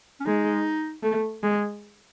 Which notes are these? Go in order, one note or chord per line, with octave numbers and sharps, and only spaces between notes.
C#4
G#3 D#4
A3
G#3